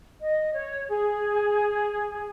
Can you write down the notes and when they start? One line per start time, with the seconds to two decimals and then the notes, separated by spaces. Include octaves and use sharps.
0.21 D#5
0.53 C#5
0.88 G#4